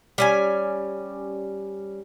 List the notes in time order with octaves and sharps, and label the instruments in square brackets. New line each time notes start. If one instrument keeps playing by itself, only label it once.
[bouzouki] G3 C#4 G#5